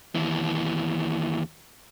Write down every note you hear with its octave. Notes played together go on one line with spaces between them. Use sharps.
D#2 E3